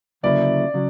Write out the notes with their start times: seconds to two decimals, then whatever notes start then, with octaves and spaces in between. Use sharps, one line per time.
0.23 D2 C#3 F#3 A#3 E4 D5
0.74 C#3 F#3